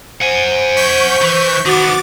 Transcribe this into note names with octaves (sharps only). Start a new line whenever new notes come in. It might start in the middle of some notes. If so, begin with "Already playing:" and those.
C5 F#5 G#5
C#6 G6 B6
E3
D#3 B3 F#4 D6 A6